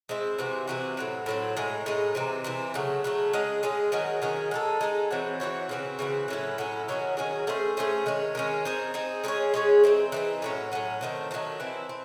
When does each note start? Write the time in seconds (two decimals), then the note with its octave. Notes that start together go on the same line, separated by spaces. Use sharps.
0.09 G#3 C4 E4 C5
0.38 C3 E3 C4 F#4
0.67 C3 E3 C4 F#4
0.97 A2 F#3 C4
1.26 A2 F#3 C4
1.57 A2 G#3 D#4
1.86 A2 G#3 D#4
2.15 C3 E3 C4
2.44 C3 E3 C4
2.74 C#3 F#3 A3
3.04 C#3 F#3 A3
3.33 G#3 C#4 G#4 D#5
3.63 G#3 C#4 G#4 D#5
3.92 D#3 F#3 C#4 G#4
4.22 D#3 F#3 C#4 G#4
4.51 G#3 D#4 A4
4.81 G#3 D#4 A4
5.11 E3 C4 F#4 C#5
5.40 E3 C4 F#4 C#5
5.69 C#3 E3 C4 F#4
5.99 C#3 E3 C4 F#4
6.28 A2 F#3 C#4 E4
6.58 A2 F#3 C#4 E4
6.88 D#3 F#3 C#4 G#4
7.17 D#3 F#3 C#4 G#4
7.47 A3 C#4 G#4 C5
7.77 A3 C#4 G#4 C5
8.06 D#3 G#3 C#4
8.35 D#3 G#3 C#4
8.65 C4 D#4 G#4
8.94 C4 D#4 G#4
9.24 G#3 C#4 G#4 C#5
9.54 G#3 C#4 G#4 C#5
9.84 E3 C4 D#4
10.12 E3 C4 D#4
10.42 A2 F#3 C#4
10.72 A2 F#3 C#4
11.01 D#3 F#3 A3 C4
11.31 D#3 F#3 A3 C4
11.60 E3 C4 E4
11.89 C4